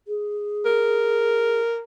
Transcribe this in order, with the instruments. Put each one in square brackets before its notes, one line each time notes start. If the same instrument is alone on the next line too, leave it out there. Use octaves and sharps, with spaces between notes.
[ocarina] G#4
[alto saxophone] A#4